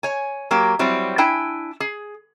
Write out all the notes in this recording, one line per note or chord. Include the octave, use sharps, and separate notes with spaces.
C#5 G#5
F#3 A#3 G4
F#3 G3 C4 E4
D4 E4 G5 G#5
G#4